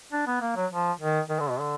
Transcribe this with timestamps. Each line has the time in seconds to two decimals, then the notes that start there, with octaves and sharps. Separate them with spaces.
0.13 D4
0.27 B3
0.41 A#3
0.56 F#3
0.72 F3
1.00 D#3
1.29 D#3
1.40 D3
1.50 B2
1.60 D3